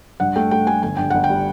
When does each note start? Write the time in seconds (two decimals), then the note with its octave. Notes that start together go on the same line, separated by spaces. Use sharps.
0.20 G2 F#5
0.36 A3 G5
0.51 A3 G5
0.67 A3 G#5
0.83 G1 G#5
0.97 G2 G5
1.10 G1 F#5
1.24 G5
1.30 G3